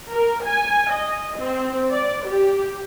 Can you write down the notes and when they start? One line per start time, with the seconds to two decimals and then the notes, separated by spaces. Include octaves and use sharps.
0.13 A#4
0.44 G#5
0.90 D#5
1.38 C4
1.92 D5
2.27 G4